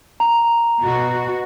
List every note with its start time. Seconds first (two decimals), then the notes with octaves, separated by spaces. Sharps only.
0.20 A#5
0.82 B2 F#4